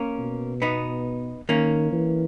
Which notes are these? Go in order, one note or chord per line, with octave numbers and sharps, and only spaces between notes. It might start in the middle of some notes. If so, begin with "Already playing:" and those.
Already playing: A#3 C#4
B2
B3 D#4
D#3 A#3 C#4
E3